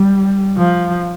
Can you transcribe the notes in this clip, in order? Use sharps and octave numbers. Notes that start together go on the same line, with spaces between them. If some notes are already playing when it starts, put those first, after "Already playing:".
Already playing: G3
F3